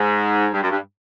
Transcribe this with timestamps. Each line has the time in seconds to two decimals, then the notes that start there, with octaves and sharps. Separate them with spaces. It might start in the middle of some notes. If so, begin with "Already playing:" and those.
Already playing: G#2
0.53 G2
0.62 F#2
0.70 G2